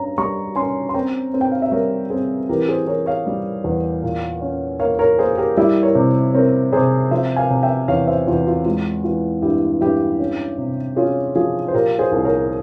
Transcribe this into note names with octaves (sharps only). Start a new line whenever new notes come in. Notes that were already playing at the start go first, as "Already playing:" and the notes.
Already playing: G2 C#4 A#5
G3 A#5 C#6
C#4 G#5 C6
C6
C4 G5 A#5
C4
G5
F5
E5
G3 A#4 C#5
C4 G#4 C5
E3 G4 A#4
G#4 C5
E3 A#4 C#5
C#5 F5
G3
E2
A#2
C#4
A#3 C#5 F5
A#4 C#5
A#3 G#4 C5
G4 A#4
G3 E4 G4
A#4 C#5
C3
C4 A#4 C#5
C3 G#4 C5
F3 C5 E5
F5 G#5
C3
E5 G5
E2 C#5 F5
C5 E5
E2 F4
F4
G#3 F4
E3 F4
G2 E4 G4
G2 E4 G4
C#4
C3
C#4 F4 G#4
F3 F4 G#4
C5
A#2 G4 A#4
G#4 C5
C2
A#4 C#5